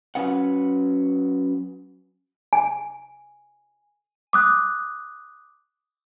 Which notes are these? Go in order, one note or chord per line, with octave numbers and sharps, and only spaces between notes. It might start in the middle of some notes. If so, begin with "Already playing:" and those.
F#3 C#4 B4 F#5
G#5
D6 D#6 F#6